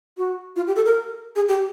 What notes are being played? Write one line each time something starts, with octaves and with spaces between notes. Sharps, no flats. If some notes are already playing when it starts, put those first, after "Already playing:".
F#4
F4
G4
A4
A#4
G#4
G4